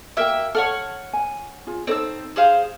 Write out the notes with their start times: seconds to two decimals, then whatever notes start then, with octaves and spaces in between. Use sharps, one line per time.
0.17 A#3 F#4 A#4 E5 G5
0.55 A4 C#5 F#5 F6
1.13 G#5
1.67 F4 G#4
1.87 C4 D#4 A4 C#5 E6
2.36 G#4 C5 F5